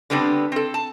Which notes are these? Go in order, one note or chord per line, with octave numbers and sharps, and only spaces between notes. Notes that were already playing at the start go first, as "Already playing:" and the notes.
D3 G3 B3 C4 D4
C4 A4
A5